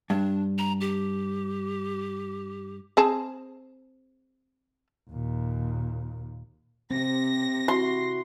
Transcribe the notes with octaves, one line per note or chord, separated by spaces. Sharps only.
G2 D4
A#5
G4
C4 G#4 A5
D#2 A#2
C3 C4 A#6
E4 F#4 C6